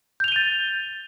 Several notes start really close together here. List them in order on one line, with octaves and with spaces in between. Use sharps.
G6 F7 G7 D#7 A6